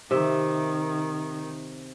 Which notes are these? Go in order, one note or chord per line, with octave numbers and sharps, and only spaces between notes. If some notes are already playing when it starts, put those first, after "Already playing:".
C3 D#3 E5